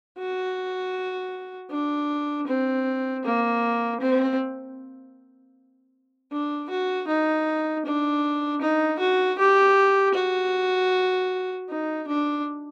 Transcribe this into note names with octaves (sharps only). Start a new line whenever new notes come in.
F#4
D4
C4
A#3
C4
D4
F#4
D#4
D4
D#4
F#4
G4
F#4
D#4
D4